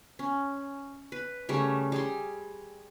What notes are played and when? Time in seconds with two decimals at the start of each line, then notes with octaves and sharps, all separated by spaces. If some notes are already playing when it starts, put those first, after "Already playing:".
0.19 C#4
1.12 B4
1.49 C#3 G3 A3 C#5
1.92 G3 G#4 C6